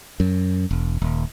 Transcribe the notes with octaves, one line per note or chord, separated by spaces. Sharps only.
F#2
E1
D#1